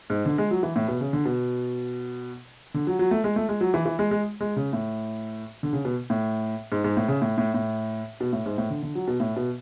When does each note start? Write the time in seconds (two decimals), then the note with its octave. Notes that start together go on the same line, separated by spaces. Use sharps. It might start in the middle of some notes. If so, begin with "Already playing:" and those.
0.10 G#2
0.26 D3
0.38 G#3
0.51 F#3
0.63 E3
0.76 A2
0.88 B2
1.01 C#3
1.13 D3
1.25 B2
2.74 D3
2.87 F#3
2.99 F#3
3.11 A3
3.24 G#3
3.36 A3
3.49 G#3
3.61 F#3
3.74 E3
3.86 E3
3.99 G#3
4.11 G#3
4.41 G#3
4.56 C#3
4.73 A2
5.63 D3
5.73 C#3
5.85 B2
6.10 A2
6.72 G#2
6.84 G#2
6.97 A2
7.08 C#3
7.22 A2
7.38 A2
7.54 A2
8.20 B2
8.33 A2
8.46 G#2
8.58 A2
8.70 D3
8.83 D3
8.95 F#3
9.08 B2
9.20 A2
9.36 B2